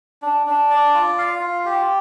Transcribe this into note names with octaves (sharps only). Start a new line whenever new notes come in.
D4
D4
D5
F4
F5
F4
G4